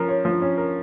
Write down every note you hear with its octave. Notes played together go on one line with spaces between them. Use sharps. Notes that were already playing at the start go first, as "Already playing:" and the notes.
Already playing: F3 C#4 A#4
C#5
F3
C#4
A#4